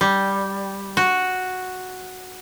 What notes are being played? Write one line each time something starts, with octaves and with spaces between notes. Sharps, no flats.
G3
F#4